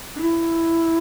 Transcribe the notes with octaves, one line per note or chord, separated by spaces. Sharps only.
D4
E4